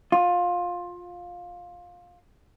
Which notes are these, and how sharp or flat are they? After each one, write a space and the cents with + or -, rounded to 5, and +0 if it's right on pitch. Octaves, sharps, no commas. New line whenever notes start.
F4 +15